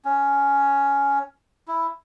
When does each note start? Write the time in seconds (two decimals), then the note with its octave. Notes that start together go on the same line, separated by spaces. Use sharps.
0.05 C#4
1.68 E4